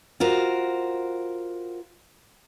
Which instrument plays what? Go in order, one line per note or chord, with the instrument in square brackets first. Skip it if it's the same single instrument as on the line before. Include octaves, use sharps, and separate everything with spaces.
[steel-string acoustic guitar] F4 F#4 A#4 C5